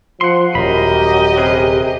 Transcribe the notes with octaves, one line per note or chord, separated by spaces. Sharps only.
F3 F#5 C6
D#1 F#2 G4 A#4 D#5 B5
C3 G#4 A#4 B4